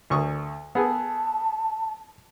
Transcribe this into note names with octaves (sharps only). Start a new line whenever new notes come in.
D2 C#6 D#6
B3 G#4 A4 A5